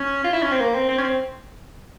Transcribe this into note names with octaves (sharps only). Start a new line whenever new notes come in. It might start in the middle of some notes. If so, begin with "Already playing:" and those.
Already playing: C#4
F4
E4
C#4
C4
A#3
C4
C4
C#4
C4